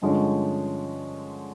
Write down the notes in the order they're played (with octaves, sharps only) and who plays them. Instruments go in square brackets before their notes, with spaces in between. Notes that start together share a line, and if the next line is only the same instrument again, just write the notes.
[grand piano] G2 D3 F3 G#3 C#4